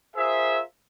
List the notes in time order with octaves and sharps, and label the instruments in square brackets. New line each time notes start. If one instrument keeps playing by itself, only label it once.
[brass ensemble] F4 G#4 A#4 C5 E5